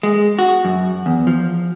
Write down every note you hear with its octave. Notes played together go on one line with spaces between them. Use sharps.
G#3
F#4
F#2
E2
F3